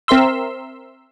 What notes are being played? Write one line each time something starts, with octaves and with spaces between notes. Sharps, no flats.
C4 A#4 E5 C6 E6